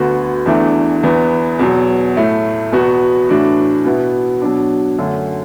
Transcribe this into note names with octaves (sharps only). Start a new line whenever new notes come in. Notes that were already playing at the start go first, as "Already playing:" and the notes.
Already playing: D2 D3 B3 F#4
E2 E3 A3 D4
E2 E3 B3
E2 B2 F#3
A2 A3 E4
E2 B2 B3 F#4
A2 E3 D4 F#4
B2 B3 E4
B2 F#3 D4
F#2 D3 A3